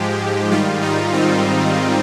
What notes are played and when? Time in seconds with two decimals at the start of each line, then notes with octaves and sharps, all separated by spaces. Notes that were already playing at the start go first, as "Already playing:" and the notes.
Already playing: G#2 F3 G#3 G4
0.51 G#2 D#3 G3 F4
0.82 D#4
1.13 C4